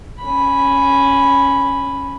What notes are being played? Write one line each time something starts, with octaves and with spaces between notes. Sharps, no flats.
C#4 B5